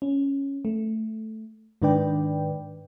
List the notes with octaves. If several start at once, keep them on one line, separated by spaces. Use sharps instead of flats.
C#4
A3
G#2 D#3 D4 B4 D5 G5